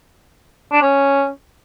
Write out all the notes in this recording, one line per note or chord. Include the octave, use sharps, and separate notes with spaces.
D4
C#4